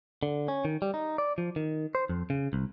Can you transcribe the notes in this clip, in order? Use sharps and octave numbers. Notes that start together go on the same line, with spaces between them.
D3
C#4
D#3
G3
D#4
D5
F3
D#3
C5
F2
C#3
C2